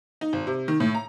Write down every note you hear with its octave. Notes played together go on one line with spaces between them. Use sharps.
D#4
G#1
C3
D#3
A2
A#5